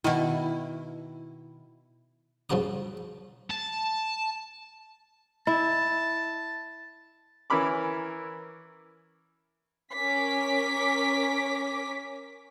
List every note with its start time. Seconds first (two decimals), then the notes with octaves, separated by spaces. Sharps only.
0.04 B2 D#3 E4
2.50 G2 C#3 F3 F#4 A#5 D6
3.50 A5
5.47 E4 A5
7.50 E3 C#4 A#4 B5 D6
9.94 C#4 A#4 D6 B6